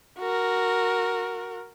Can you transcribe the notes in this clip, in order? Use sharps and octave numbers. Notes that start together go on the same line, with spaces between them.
F#4 A#4